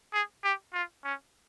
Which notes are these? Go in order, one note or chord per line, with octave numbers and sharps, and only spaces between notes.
G#4
G4
F4
C#4